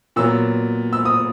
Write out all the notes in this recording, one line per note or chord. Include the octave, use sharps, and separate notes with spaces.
A#2 F#3 B3 E6
E6
D#6